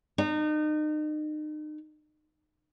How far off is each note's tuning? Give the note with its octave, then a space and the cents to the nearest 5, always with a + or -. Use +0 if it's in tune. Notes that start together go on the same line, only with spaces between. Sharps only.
D#4 -35